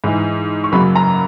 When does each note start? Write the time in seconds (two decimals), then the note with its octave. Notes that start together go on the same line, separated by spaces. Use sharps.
0.04 G#2 E3 G#3
0.64 C#6
0.72 F#2 C#3 F#3 A#3 B5
0.95 A#5